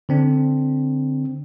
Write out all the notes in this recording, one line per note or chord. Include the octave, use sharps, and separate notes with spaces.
D3 C4 D4